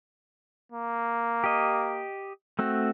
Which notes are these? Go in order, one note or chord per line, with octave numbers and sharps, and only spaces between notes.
A#3
G4 D#5
A3 C4 F#4